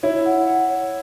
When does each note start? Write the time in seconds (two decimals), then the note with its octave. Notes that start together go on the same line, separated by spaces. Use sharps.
0.03 E4 C#5
0.26 F#5
0.47 F#5
0.69 C#5